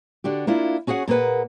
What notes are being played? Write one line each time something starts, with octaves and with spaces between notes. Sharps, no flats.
D3 D4 F#4 G4
A#3 D4 E4 F4
C#4 F#4 G#4 C#5 F#5
A#2 A#3 G#4 B4 F#5